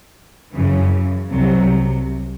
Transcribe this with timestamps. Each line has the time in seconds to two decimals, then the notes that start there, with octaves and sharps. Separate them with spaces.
0.55 F#2 C#3 E3
1.33 C2 C3 F#3